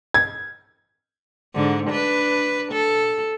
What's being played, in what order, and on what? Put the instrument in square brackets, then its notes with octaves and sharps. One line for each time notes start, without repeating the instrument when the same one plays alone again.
[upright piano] G#6
[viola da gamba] G#2 D3
D4 B4
A4